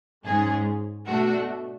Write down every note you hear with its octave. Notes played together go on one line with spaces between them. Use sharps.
G#2 G#3 C#4 G#4
B2 A3 D4 F#4